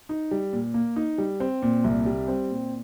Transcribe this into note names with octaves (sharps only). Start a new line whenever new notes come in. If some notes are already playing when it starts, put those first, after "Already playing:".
D#4
G3
A#2
A#3
D#4
G3
C4
A#2
C2
G3
C4
A#2